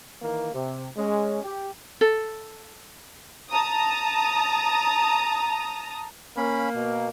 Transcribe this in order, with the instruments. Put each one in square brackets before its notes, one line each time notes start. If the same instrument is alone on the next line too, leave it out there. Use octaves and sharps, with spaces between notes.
[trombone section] D#3 E3 A#3
C3
G#3 C#4
G4
[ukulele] A4
[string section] A5 A#5 D#6
[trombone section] A#3 [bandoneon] C#4 B5
[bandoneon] B2